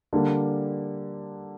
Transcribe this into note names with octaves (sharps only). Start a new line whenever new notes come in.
D3 G3 A#3 D4